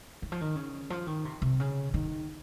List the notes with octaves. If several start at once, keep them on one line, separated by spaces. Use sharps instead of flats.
D#3
F3
D#3
C#3
F3
D#3
C3
C3
C#3
D#3